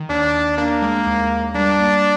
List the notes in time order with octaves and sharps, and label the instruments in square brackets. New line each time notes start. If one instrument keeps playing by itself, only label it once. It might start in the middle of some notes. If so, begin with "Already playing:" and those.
Already playing: [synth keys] D#3
[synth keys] D#2 [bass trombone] D4
[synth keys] D#2
[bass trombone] A#3 [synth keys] D4
[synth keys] G#3
D#2
D#2
[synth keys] G3 [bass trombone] D4
[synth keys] A#3